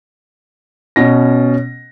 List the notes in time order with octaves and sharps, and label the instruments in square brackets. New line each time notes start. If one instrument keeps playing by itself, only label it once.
[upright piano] B2 C#4 A#6